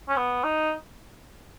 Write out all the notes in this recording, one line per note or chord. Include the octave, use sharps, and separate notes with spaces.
C#4
B3
D#4